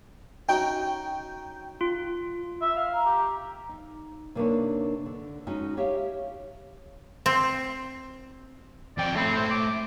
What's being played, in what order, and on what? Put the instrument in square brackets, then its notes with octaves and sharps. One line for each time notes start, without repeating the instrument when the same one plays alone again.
[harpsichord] C#4 D#4 F#4 [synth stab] G5
[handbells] F4
[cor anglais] E5
F5
[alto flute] A#5
[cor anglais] G4
[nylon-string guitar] D#4
C3 A#3 D4 D#4 B4 C#5
D3
G#3 C#4 D#4 F#4
G4 C#5 E5 F5
[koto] C4
[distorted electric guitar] F2 G5 [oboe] D5
[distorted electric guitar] A3 B5 [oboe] C4
[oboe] C5
D6